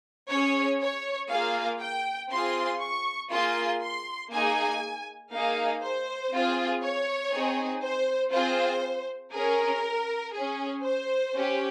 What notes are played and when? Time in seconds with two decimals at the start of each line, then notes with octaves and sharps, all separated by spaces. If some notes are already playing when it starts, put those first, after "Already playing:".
0.29 C#4 G#4 C#5
0.81 C#5
1.30 A#3 F4 G#4 F5
1.80 G5
2.30 C4 F4 G#4 C6
2.81 C#6
3.31 A#3 F4 G#4 C6
3.82 C6
4.31 A#3 D#4 G#4 G#5
5.32 A#3 D#4 G#4 F5
5.82 C5
6.32 C4 F4 G#4
6.82 C#5
7.32 C4 D#4 G#4
7.82 C5
8.33 C4 F4 G#4 C5
9.33 C#4 G#4 A#4
10.34 C#4 G#4
10.83 C5
11.34 C#4 G4